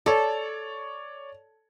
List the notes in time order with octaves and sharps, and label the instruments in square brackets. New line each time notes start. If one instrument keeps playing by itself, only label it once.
[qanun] A4 [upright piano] C#5 D5